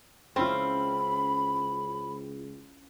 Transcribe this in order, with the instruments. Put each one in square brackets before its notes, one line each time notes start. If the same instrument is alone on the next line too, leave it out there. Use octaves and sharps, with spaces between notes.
[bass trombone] C#2 [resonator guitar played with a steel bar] C4 [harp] C#4 E4 F4 [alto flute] B5